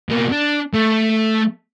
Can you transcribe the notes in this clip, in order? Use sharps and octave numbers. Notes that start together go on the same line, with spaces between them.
B2 A#3
D4
A3